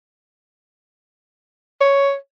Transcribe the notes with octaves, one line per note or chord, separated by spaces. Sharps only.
C#5